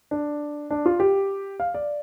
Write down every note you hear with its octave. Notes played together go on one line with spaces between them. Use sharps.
D4
D4
F4
G4
F5
D5